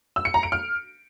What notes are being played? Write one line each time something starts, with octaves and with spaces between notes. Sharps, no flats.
E6
C#7
A#5
D7
F6